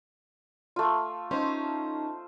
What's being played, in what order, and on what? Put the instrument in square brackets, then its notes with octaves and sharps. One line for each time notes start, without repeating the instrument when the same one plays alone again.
[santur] A3 F4
[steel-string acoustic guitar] C#4 D#4 [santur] C5